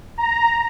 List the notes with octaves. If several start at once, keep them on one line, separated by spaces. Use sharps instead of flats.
A#5